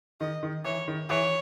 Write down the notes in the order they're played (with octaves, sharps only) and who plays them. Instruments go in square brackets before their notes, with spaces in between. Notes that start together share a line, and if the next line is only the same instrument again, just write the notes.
[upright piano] D#3 [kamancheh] D#5
[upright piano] D#3
[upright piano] E3 [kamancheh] C#5
[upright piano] D#3
[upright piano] E3 [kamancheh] C#5